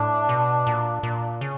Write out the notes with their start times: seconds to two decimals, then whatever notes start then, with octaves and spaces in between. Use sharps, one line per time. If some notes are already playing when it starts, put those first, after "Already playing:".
Already playing: A2 D4
0.29 B2
0.67 A#2
1.03 A#2
1.41 C#3